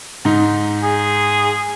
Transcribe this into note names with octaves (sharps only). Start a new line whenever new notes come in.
G#2 D#4
G#4